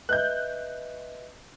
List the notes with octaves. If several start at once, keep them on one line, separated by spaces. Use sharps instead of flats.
B4 D#5 E5 F#6 G6